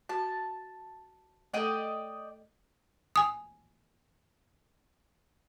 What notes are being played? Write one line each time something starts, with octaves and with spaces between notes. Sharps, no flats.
F#4 A5
A3 A4 D5 D#5 G5
G#5 D#6